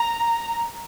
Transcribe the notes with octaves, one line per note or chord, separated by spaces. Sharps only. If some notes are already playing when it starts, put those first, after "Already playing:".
Already playing: A#5